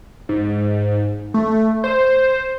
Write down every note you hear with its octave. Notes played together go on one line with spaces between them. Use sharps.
G#2
A3
C5